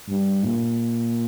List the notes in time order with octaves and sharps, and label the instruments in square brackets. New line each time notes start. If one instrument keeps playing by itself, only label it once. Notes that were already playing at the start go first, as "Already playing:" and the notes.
[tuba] G2
A#2